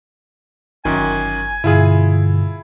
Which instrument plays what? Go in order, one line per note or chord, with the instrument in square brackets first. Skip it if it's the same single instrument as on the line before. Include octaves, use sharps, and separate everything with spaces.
[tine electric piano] G1 [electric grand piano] F#2 D#3 [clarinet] G#5
[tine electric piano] G2 B2 D3 [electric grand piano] E4 F4 G#4